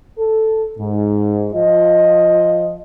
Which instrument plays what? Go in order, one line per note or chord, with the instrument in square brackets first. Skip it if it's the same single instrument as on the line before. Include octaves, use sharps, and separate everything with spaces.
[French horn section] A4
G#2
F3 F4 D#5